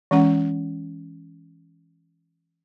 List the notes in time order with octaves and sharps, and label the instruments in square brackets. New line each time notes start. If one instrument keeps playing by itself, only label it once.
[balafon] E3 G#3 C#4 F#5